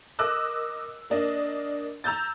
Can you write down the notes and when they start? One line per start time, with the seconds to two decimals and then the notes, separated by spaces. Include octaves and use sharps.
0.19 A#4 D#5 D6 E6 F#6
1.10 A#3 D4 D#5
2.04 A#5 E6 G6 A6